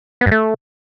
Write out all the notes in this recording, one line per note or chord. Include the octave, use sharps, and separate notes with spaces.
B3
G2
A3